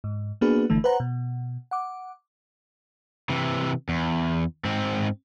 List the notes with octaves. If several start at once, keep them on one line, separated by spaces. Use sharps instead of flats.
G#2
A#3 B3 D4 F#4 G#4 B4
G1 D3 E3 A3
B4 C5 F#5 A#5
B2
F#5 D6
C3 E3
E2
G#2 C4